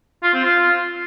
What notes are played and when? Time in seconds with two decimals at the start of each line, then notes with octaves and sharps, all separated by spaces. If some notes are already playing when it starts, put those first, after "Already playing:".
0.23 F4
0.34 C4
0.44 F4